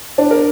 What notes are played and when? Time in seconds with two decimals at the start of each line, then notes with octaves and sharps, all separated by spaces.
0.18 D4
0.31 A#4